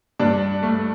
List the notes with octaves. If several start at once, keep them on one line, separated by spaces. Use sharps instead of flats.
G2 D4 D5
A3